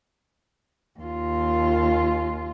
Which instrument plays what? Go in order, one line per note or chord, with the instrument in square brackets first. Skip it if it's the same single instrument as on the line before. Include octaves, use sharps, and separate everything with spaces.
[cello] D#2 F4